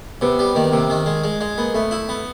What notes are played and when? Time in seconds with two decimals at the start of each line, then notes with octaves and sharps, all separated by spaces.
0.21 C3 B3
0.39 G3
0.55 D#3 A#3
0.64 B3
0.71 C3 A#3
0.90 D#3
1.06 G#3
1.24 G#3
1.41 G#3
1.57 A#3 B3
1.74 A3 B3
1.91 E4
2.09 B3